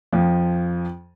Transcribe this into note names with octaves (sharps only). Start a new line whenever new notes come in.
F2 F3